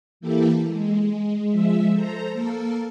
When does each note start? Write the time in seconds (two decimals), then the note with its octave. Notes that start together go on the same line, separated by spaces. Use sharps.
0.20 E3 A#3 E4 G4 A4
0.66 G#3
1.51 F3 G#3 E5
1.92 A4 C5 A#5
2.33 A#3 A4 A#4